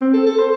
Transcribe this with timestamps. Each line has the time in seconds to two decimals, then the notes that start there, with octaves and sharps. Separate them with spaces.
0.01 C4
0.14 A4
0.26 A4
0.39 C5